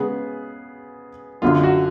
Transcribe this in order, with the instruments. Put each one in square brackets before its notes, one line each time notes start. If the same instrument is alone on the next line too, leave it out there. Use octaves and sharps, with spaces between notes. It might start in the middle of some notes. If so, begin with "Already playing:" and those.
Already playing: [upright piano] C#3 G#3 B3 [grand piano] G#4
[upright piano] F#2 D3 F#3 [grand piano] F4
[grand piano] F#4